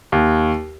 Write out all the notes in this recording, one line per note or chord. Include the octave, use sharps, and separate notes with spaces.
D#2